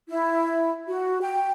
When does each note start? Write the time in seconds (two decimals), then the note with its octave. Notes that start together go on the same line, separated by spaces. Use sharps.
0.08 E4
0.88 F#4
1.21 G5